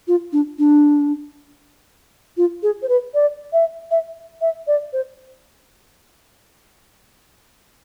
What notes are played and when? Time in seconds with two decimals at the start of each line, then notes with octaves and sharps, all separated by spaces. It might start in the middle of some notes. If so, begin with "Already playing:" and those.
0.08 F4
0.33 D4
0.59 D4
2.37 F4
2.63 G#4
2.82 C5
2.89 B4
3.14 D5
3.53 E5
3.91 E5
4.41 E5
4.67 D5
4.93 C5